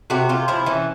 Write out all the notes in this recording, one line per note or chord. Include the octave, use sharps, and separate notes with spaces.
C3 F#4
C3 F4
F3 E4
E3 C#4